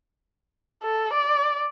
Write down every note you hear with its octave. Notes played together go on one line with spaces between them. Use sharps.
A4
D5